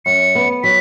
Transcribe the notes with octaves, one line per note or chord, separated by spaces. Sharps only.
F#2 C#7
B3
F#3 B6